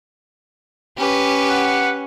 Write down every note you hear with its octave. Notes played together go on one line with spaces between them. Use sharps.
C#4 G4 B4
F#5